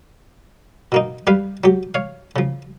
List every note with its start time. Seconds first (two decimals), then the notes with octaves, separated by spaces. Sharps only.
0.92 B2 A#3 D#4
1.27 G3 G4 B4 F5
1.64 F#3 G4
1.94 C#5 F5
2.36 C#3 F3